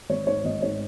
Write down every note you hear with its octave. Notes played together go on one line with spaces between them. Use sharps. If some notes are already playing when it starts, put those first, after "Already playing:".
G#1 C#5
G#2 C#5
G#1 D#5
G#2 C#5